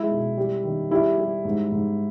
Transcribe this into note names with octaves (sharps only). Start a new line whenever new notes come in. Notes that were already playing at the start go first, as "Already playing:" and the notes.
Already playing: G#3 E4
B2
G3
D#3
G3 E4
G3
G#2
G#2